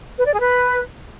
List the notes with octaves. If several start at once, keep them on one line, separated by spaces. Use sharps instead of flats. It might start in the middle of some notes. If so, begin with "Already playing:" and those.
B4
D5
G#4
B4